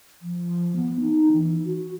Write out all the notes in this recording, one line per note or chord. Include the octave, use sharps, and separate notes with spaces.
F3
B3
D#4
E3
F#4